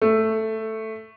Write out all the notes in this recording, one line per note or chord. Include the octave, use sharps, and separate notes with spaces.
A3